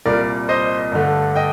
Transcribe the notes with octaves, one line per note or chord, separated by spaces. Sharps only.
C2 A#2 G3 A#3 A#4 D5
C5 D#5
G2 D3 A3
D#5 G5